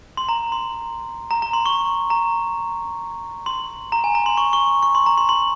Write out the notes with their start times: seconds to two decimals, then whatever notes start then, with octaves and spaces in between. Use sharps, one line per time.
0.17 C6
0.29 A#5
0.52 C6
1.31 A#5
1.42 A#5
1.53 C6
1.66 C#6
2.10 A#5
3.46 C6
3.92 A#5
4.04 G#5
4.15 A#5
4.26 C6
4.37 C#6
4.53 C#6
4.83 C#6
4.95 C6
5.06 A#5
5.18 C6
5.29 C6